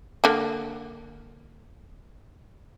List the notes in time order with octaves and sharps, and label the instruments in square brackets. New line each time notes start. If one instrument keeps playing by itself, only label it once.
[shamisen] D3 A#3